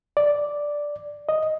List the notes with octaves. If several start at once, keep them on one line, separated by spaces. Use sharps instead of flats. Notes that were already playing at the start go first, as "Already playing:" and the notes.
D5
D#5